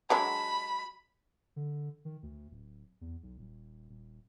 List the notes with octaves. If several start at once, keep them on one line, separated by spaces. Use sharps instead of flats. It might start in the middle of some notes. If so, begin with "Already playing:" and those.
F#3 G#3 D4 B5
D3
D#3
D2
D1
E2
B1
D#1
D#1